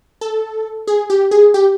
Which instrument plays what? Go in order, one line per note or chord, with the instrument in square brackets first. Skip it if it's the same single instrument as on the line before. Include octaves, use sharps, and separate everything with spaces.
[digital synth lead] A4
G#4
G4
G#4
G4